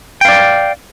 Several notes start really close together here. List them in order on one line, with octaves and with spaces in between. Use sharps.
G5 F5 D5